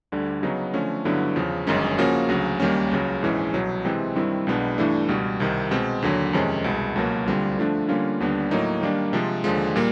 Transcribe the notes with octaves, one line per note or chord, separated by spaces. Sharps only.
D2 D3 G3
C#3 F#3 B3 D#4
D3 F3 A3 C#4
G2 D3 F#3 B3 E4
E2 C#3 F3
G1 F#2 D#3 G#3 C#4
C#3 F3 A#3 C#4 F#4
D2 C#3 F#3
D#2 D#3 G3 A#3 C#4
C#2 C#3 F#3
A#1 G#2 E3 G#3 C#4
C2 B2 F#3
C3 E3 G#3 C4
G2 D#3 G3 C4 E4
B1 B2 G#3 B3 D4
G2 E3 A3 D4
C#2 B2 G3
C2 C3 D#3
B2 G#3 C4
D#2 D3 F#3
F2 C3 D#3 G#3 C#4
C2 B2 G#3
C#2 B2 F#3 A#3
D2 D3 G3 C4 F4
D3 F3 A3 D4
D3 G3 A#3 C#4 F4
D#2 D3 G3 B3 D4
A2 F#3 A#3 D#4
D#3 G3 A#3 D4
C3 F3 G#3
D#2 D3 F3 G#3
A#2 G3 A#3